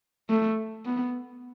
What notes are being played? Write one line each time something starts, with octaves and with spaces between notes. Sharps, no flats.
A3
B3